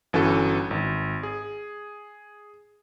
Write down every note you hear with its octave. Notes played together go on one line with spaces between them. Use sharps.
G1 E3 C#4 F#4 A4 C#6
G#1
G#4